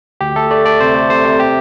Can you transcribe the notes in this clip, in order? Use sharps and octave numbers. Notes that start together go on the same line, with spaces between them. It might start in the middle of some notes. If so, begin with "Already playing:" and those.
D2 G4
A3 A4
A3 D5
A3 D5
C3 C5
A3
C3 C5
C3
G4